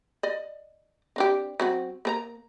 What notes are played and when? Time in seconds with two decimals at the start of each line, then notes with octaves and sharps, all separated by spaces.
0.23 D5 D#5
1.16 C4 D4 G4
1.60 F#3 C4 F#4
2.05 A#3 A#4 A#5